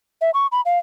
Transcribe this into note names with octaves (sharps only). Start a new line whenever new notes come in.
E5
C#6
B5
F5